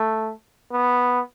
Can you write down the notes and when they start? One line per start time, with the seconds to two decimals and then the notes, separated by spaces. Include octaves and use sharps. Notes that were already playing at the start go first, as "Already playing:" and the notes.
Already playing: A3
0.72 B3